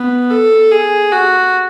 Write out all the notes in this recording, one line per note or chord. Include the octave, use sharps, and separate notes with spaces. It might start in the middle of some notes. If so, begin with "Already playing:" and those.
Already playing: B3
A4
G#4
F#4